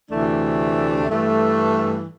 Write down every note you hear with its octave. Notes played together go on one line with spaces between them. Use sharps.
D2 C3 E3 A3 D4
G2 E3 A3